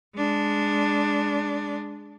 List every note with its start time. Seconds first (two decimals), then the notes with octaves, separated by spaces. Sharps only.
0.16 G#3 D4